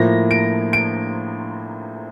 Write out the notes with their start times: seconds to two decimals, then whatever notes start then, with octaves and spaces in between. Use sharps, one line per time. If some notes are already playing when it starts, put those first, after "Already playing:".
Already playing: A2 F3 A#3 A#6
0.31 D7
0.73 D7